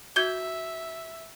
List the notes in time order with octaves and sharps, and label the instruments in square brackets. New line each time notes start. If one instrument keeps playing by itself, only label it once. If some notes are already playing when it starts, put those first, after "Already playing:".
[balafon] F#4 [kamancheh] E5 [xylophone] G6 G#6 G7